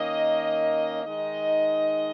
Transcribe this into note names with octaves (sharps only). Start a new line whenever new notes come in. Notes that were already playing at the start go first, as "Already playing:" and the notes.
Already playing: D#3 A#3 C#4 D#5
D#3 G#3 D#4 D#5